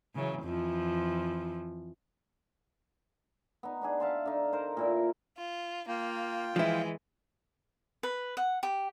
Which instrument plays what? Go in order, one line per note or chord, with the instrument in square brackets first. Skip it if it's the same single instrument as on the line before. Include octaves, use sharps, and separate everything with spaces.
[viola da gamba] C#3 E3 F#3
F2 E3 F3
[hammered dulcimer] B3 D#4
B3 D4 G#4
E5 F5 A5 C6
D3 D#4
A#4 C5
A#2 E4 A#4
[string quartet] F4
[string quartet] A#3 [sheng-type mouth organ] F4 G5
[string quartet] E3 G#3 [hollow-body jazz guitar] F3 E4
[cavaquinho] B4
F#5
G4